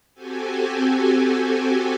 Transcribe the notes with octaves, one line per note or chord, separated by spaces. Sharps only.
C4 F#4 G4 A4 G#5